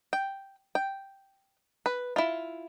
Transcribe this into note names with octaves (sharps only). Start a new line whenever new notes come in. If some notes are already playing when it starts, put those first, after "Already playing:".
G5
G5
B4
E4 F4